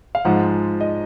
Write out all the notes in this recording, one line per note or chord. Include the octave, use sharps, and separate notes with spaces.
F5
G#2 F3 G#3 F#5
D#5